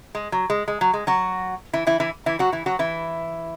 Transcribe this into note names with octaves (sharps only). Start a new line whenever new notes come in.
G#3
F#3
G#3
G#3
F#3
G#3
F#3 F#4
E3 E4
E3 E4
E3 E4
E3 E4
F#3 F#4
E3 E4
F#3 F#4
E3 E4